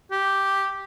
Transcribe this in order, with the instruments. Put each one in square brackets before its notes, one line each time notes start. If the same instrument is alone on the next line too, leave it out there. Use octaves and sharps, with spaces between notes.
[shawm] G4